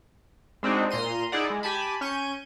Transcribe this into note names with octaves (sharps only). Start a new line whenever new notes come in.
G#3 C4 D4 D#4 F#4
A#2 A#5 C6 D#7
D#4 E4 G#4 D5 F#5
G#3
G4 G#5 A5 B5
C#4 C#6 G6 D#7